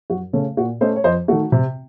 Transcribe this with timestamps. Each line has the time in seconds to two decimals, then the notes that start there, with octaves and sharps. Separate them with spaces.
0.10 F#2 F#4
0.33 C#3 A3 C#4 A4
0.57 A#2 F#4
0.81 A3 C#4 C5 D#5
0.96 C#5
1.04 F2 C5 D#5
1.28 D#3 A3 F#4
1.52 C3